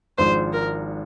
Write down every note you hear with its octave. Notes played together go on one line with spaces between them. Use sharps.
G#1 G#2 F3 G#3 D4 C5
A#4